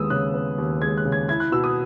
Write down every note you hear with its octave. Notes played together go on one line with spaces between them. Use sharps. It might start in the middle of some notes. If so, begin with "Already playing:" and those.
Already playing: D#2 G#3 B3 D#6 E6
C#3 F#6
B3
D#2
G#3 G#6
F#6
C#3
G#6
E4 G#6
F#6
B2 E6
D#6